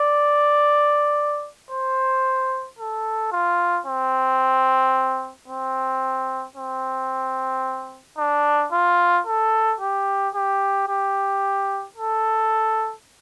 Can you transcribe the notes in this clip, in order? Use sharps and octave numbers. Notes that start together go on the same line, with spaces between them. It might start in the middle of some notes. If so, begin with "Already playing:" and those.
Already playing: D5
C5
A4
F4
C4
C4
C4
D4
F4
A4
G4
G4
G4
A4